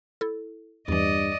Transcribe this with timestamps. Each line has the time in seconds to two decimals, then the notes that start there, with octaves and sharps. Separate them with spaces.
0.21 E4 A4
0.88 E2 G2 E3 D5 D#5